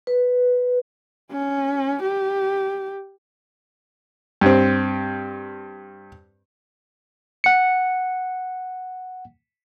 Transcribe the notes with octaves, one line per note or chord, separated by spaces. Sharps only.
B4
C#4
G4
G2 C4
F#5 C#7